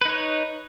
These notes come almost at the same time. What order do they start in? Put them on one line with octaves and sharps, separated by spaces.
B4 D#4 C#5